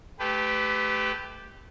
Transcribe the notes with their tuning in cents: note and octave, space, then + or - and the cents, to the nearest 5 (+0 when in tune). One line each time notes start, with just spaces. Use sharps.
A3 -25 G4 +0 B4 +25